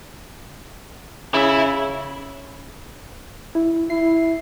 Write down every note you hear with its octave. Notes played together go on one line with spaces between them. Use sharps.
C#3 E4 E5
E4
E4 C7